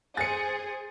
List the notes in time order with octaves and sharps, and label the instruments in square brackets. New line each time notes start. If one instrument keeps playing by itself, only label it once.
[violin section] G#4 C5 [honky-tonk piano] A6 C#7